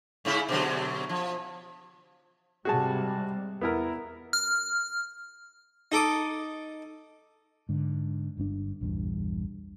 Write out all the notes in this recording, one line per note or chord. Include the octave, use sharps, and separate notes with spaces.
G#2 C#3 E4
B2 D3 F#3
F3
G#2 C3 G3 F#4 G#4 A5
E2 B3 E4 A#4
F6
D#4 A4 D6 D#6
G#2 D3
G1 G2 C4 D4
A#1 E2 G2